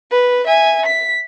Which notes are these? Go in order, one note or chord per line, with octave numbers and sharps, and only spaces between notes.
B4
E5 G#5
B6